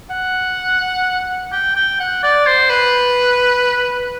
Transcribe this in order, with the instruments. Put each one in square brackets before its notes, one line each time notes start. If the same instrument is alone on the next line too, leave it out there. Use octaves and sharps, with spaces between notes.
[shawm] F#5
G5
G5
F#5
D5
C5
B4